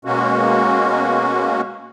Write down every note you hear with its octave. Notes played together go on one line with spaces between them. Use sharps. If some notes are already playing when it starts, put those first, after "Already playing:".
B2 G#3 A#3 C#4 F#4